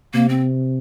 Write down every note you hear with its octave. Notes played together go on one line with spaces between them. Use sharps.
C3 A#3
C4